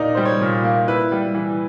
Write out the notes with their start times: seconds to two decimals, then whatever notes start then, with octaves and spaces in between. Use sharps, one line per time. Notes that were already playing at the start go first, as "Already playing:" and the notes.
Already playing: A#2 A#3 D#4 D5 D#5
0.15 G3 C5
0.25 C#5
0.41 A#2
0.64 A#3
0.88 E4 B4
1.12 G3
1.35 E3